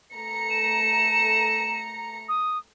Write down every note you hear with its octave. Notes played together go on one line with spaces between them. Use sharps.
A3 A#5 C#7
E7
D#6